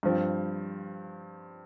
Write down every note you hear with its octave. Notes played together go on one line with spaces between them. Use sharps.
G2 F3 C4